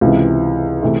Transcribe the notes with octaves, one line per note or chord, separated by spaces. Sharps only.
C#2 C3 E3
C3 E3 A3